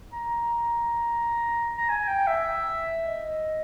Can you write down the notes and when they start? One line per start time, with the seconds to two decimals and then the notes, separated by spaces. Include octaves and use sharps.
0.13 A#5
1.77 A#5
1.89 G#5
2.08 G5
2.27 E5
3.05 D#5